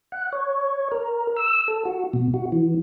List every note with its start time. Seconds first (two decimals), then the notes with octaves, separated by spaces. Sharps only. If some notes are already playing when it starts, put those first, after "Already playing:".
0.12 F#5
0.32 C#5
0.92 A#4
1.36 E6
1.68 A4
1.85 F#4
2.13 B2
2.34 F#4
2.52 E3